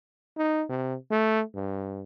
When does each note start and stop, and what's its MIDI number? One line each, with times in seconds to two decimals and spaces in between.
0.37 0.64 63
0.69 0.94 48
1.11 1.41 57
1.55 2.03 43